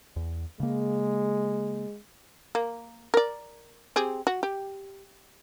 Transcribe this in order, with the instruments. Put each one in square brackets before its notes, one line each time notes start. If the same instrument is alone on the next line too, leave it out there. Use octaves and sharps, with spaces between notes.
[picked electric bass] E2
[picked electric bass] C#3 A#3 [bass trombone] G#3
[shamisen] A#3
A#4 D5
C4 G4 G#4
F#4
G4